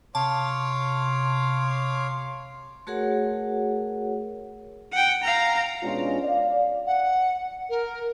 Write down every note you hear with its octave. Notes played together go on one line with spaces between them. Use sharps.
C3 C#5 F5 A5 C6 D6
A3 F#4 G#4 A#4 C#5 F#5
F#5 G5
F5 A#5
B2 G#3 C#4 D4 F4
D5 F5
F#5
A#4